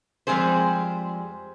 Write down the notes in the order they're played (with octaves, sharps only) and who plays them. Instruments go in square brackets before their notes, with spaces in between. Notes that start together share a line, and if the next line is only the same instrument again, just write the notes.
[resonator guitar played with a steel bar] F2 G3 G#3 C4 G#4 C5